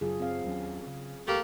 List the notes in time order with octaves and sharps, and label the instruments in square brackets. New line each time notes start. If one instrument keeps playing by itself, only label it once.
[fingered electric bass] F#2 C#3 [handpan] F#3 F4 G#4
[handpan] C4 F5
[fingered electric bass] D#2 F#3 C#4
C#3
[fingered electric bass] C2 [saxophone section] A3 A#3 G4